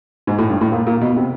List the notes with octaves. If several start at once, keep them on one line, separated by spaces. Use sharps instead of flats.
G#2
A2
G2
A2
A#2
A#2
B2
C3